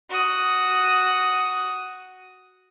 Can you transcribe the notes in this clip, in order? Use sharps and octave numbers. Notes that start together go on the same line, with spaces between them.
F#4 D#6